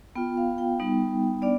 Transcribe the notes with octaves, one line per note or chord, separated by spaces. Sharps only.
B3 F4 G5
F5
G5
G3 B3 D#4
B3 D4 D5